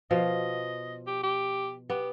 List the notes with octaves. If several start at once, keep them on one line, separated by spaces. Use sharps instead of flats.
B2 F3 D#5 F5
G4
G4
B3 G4